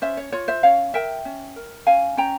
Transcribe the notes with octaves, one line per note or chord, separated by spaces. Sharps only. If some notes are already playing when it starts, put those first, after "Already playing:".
C#4 C5 E5
C#5
F4 C#5
C5 E5
C#4 C#5 F5
A#4 E5 G5
C#4
A#4
C#4 F5 G#5
C#4 G5 A#5